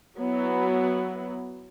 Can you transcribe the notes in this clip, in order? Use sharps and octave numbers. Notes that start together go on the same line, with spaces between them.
F#3 B3 E4